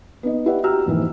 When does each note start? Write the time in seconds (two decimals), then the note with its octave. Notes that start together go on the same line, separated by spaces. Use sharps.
0.23 B3 D#4 D#5
0.46 E4 G4 B4 D5 E5 F#5
0.64 F#4 G4 A#5 E6 F6
0.86 F2 G#2 E3 A#3